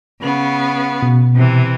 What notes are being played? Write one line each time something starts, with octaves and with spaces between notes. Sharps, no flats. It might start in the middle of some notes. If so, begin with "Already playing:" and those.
C#3 B3
B2
C3 E3